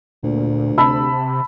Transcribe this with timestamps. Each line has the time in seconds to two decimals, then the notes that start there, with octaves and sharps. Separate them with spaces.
0.23 D2 A#2
0.78 C3 A5 B5 E6